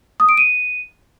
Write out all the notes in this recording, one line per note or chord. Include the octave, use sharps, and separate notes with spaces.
D#6
D7
D#7